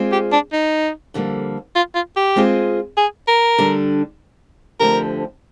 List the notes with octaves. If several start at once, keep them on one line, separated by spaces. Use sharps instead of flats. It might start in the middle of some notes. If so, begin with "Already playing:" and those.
Already playing: G#3 C4 F4 G#4 D5
G4
D4
D#4
F2 D3 G3 A#3
F4
F4
G4
G#3 C4 F4 G#4 D#5
G#4
A#4
D3 G3 D4
D2 D3 F3 C4 G4 A#4